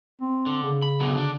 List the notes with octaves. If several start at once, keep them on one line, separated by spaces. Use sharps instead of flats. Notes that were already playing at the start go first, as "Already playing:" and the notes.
C4
D3
C#3
B5
B2 D3 F#3
D3 D4